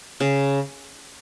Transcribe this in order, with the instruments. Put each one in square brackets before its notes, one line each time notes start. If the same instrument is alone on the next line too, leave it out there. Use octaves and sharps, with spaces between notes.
[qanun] C#3